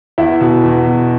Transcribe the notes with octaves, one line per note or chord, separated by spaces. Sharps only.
E2 E4
B2
E2
B2